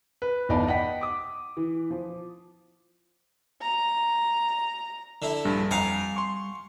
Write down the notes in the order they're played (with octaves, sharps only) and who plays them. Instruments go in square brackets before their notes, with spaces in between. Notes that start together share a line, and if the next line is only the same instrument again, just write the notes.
[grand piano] B4
G1 E2 D#4 D5 A5 B5
D#5 F#5 G5 B6
D6 D#6
E3
F3
[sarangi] A#5
[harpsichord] D3 E4
[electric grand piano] A#1 G2 [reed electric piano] G3
[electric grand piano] F2 A#5 [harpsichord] F5 F#5 G#5
[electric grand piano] C6 C#6